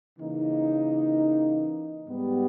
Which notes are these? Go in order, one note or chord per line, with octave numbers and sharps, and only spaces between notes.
C#3 E3 A#3 D#4
G#2 G3 B3 G4